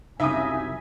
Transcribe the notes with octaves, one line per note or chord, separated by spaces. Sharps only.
C2 F#2 C#3 D#4 F4 E5 G#5 D#6